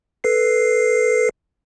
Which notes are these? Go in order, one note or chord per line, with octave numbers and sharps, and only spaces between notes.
A4 B4 C7